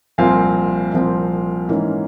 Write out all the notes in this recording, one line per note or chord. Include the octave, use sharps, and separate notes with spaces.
C2 A#2 F3 C4 F5 G#5
C2 A#2 F3 C4
G#2 E3 A#3 C#4